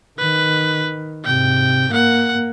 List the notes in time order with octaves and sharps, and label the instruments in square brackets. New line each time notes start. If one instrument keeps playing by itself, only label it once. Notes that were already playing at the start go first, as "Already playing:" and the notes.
[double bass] D#3 [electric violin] B4
[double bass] G#2 C3 [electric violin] G5
[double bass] A#3 [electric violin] F#5